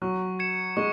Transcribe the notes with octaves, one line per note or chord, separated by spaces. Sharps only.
F#3 C#6
G#6 C#7 E7
G#3 C#6